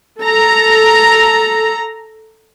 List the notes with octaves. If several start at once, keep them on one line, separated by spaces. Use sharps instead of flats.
A4 A#5